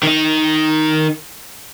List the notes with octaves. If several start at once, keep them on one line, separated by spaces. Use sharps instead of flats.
D#3 D#4